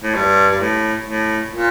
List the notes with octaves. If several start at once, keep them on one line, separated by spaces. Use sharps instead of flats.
A2
G2
G2
A2
A2
A#2